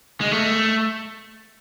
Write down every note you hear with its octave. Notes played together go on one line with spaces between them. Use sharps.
G#3
A3